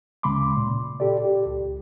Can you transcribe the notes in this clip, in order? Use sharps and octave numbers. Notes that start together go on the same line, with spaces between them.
D2 C#3 G#3 B5 C6 D6
A#2
G4 A4 D5
G4
C#2